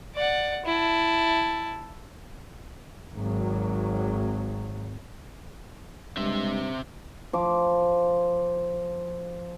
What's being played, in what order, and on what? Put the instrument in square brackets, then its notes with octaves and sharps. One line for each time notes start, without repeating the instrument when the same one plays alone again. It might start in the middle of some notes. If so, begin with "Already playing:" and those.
[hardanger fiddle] D5 F#5
E4 A5
[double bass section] G#1 F#3
[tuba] G2 [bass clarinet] G#3 [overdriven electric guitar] C4 E5
[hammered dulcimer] F3 D6